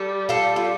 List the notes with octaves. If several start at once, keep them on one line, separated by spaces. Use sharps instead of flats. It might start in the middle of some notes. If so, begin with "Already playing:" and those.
Already playing: G3 A4
F4 A4
F4